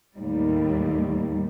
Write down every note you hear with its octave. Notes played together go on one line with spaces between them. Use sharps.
D#2 A2 G3